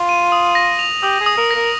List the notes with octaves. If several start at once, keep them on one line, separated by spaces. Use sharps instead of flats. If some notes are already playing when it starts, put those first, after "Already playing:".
Already playing: F4
D#7
D#6
A#6
F7
G4 D#6
G#4
D#6
A#4
A#6
A#4